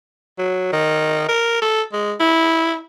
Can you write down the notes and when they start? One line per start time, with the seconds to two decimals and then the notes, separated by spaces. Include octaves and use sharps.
0.39 F#3
0.72 D#3
1.29 A#4
1.62 A4
1.93 G#3
2.20 E4